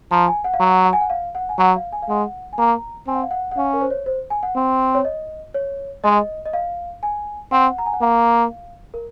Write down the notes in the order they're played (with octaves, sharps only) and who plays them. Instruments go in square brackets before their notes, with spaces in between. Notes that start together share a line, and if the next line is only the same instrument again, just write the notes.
[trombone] F3 [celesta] A#5
[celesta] G#5
F#5
F5
[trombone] F#3 [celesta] F#5
[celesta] F#5
G#5
F#5
F5
F#5
G#5
[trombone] F#3 [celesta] F#5
[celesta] F5
G#5
F5
[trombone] G#3 [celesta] F#5
[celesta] G#5
[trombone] A#3 [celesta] A#5
[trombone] C4 [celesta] G#5
[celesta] F#5
F5
F#5
F#5
[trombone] C#4 [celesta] F5
[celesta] A#4
C5
C#5
C5
G#5
F#5
[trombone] C4
[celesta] C#5
D#5
C#5
[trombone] G#3 [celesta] D#5
[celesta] D#5
F5
G#5
[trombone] C4 [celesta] F#5
[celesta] A#5
G#5
F#5
[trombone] A#3 [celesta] F5
[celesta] A#4